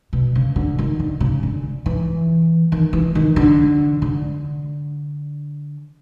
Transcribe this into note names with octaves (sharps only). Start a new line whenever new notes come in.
B2
C#3
D3
D#3
D3
C#3
D3
E3
D#3
E3
D#3
D3
D3